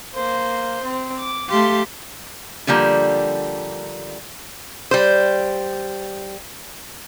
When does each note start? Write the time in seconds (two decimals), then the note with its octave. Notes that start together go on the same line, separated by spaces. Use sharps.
0.15 A#3 C5
0.83 C4
1.17 D6
1.49 A3 G4 F5 C6
2.67 D3 F3 G3 A#3
4.91 G3 C5